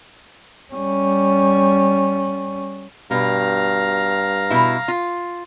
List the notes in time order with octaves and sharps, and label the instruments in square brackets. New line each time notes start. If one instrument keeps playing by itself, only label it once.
[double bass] G3 C#4
[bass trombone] G2 [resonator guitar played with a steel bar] B2 [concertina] F5 A#5
[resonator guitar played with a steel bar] B2 E4
F4